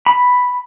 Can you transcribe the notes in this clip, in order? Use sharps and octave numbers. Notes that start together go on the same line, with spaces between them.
B5